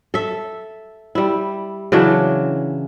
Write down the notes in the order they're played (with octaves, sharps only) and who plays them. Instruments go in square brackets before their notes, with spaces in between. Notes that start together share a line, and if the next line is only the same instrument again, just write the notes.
[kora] A4 E5
G3 E4
C#3 E3 F#3 D4